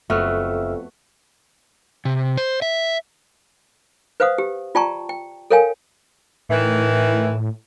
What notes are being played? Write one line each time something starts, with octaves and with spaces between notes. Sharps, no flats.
F#1 F2 A3 B3 F#4 E5 E6 F6
C3
C5
E5
B4 C5 F5 F#5 D#6
G4
F4 D5 G5 A5 A#5 C#6
G5
A4 A#4 C#5 F5 G5 G#5
A2 D#3 E3